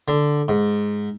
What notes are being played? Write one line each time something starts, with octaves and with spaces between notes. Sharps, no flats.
D3
G#2